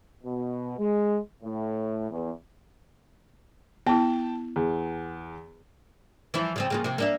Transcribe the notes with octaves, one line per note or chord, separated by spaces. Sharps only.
B2
G#3
A2
E2
B3 E4 G5 A5
E2
E3 F3 E4
C#3 F3 C4
C#3 A#3 F4
C3 A#3
A#3 D4 E5